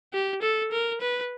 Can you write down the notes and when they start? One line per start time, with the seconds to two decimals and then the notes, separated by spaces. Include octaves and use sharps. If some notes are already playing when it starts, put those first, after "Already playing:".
0.13 G4
0.42 A4
0.72 A#4
1.01 B4